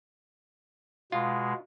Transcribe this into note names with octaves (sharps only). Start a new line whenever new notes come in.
B2 G#3 F4